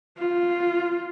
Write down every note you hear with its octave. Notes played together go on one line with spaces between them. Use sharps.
F4